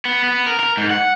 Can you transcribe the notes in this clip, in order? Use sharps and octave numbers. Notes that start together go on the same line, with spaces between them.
B3
B3
A#4
A#4
G#2
F#5